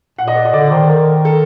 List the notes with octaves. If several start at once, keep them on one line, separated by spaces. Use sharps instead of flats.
A#2 F#5
D#5
D5
D#5
D3 D5
D#3 C5
A#4
A4